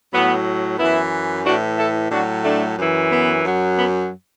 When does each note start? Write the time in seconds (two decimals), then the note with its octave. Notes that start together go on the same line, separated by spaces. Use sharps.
0.12 A2 F#3 B3
0.79 F#2 E3 B3 E4
1.45 A2 E3 D4 F#4
1.78 E4 A4
2.11 A2 F#3 D4 F#4
2.44 A3 D4
2.77 F#2 E3
3.10 B3
3.44 F#2 F#3
3.77 B3